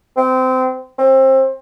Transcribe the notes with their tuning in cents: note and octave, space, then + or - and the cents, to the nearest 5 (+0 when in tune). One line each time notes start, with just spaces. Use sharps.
C4 -25
C4 +25